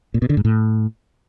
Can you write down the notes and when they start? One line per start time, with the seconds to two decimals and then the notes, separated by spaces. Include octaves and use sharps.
0.14 A#2
0.22 B2
0.29 D3
0.37 G#2
0.45 A2